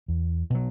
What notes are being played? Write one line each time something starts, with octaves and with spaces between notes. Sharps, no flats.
E2
B2 F#3